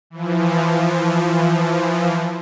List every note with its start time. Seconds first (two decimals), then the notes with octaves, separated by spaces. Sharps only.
0.10 E3 F3